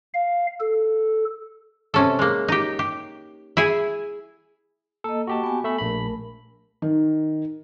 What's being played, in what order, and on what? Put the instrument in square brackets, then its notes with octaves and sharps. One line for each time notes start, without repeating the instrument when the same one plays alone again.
[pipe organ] F5
A4
[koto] C3 C#4 A4
G#3 A#3
D#4 G4
G4
E4 G#4 G#5
[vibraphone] A#3 D#5 [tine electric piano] A4
[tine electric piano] F#4 G4 A5
[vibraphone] B3 G#5
[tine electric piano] A3 E5 B5
[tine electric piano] A#1 B5 [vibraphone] A3 A#4
[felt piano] D#3